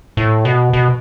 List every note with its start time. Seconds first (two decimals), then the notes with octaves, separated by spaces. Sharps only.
0.17 A2
0.45 B2
0.73 B2